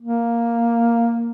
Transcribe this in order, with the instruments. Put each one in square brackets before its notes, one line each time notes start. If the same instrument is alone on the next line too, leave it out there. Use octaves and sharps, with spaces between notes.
[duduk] A#3